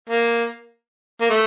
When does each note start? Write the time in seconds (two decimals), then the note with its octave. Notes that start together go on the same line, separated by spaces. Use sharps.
0.10 A#3
1.21 A#3
1.30 A3